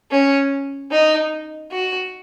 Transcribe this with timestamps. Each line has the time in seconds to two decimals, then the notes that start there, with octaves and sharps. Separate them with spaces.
0.11 C#4
0.91 D#4
1.71 F#4